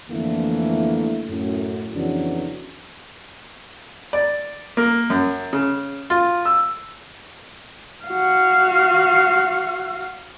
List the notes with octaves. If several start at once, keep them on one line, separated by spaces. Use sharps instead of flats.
F2 D3 E3 A3 A#3 E4
F#2 A2
F2 C#3 E3 F#3 B3 D4
D5
A#3
F#2
C#3
F4
E6
F#4 F5